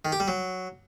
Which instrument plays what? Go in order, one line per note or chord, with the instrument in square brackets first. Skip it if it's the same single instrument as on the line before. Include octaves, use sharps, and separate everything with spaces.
[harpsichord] D#3
G4
G3
F#3